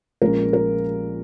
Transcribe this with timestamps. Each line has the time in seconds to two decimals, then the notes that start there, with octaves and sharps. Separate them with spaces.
0.22 A#1 A#2 G#3 C#4 A#4
0.53 A#4